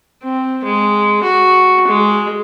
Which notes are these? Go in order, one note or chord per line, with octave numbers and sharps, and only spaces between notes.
C4
G#3
F#4
G#3